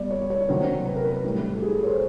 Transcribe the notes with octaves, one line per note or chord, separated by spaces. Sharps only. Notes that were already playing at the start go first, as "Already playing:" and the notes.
Already playing: B2 G3 D5
C#5
C#5
C3 D#3 F#3 C5
B4
A#4
B4
A2 E3 G3
A4
G4
G#4
A4
C#5
C5